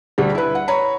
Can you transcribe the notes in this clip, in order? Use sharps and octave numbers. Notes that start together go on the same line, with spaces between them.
D2 G3
E4 B4
F#5
C#5 A#5 B5